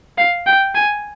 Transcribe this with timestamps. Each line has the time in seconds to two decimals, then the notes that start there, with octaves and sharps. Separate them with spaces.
0.18 F5
0.47 G5
0.75 G#5